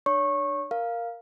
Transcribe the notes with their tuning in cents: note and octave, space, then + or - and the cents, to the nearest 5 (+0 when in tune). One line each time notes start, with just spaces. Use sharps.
D4 +30 C#5 +25 C#6 -20
A#4 +0 F5 +0